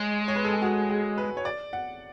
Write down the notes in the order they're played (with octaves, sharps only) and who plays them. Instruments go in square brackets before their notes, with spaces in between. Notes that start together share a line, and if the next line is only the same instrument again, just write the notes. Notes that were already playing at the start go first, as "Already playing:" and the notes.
Already playing: [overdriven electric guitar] G#3 [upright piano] C#5
[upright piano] C#5
B4
A4
G#4
F#4
G#4
B4
C#5
D5
F#5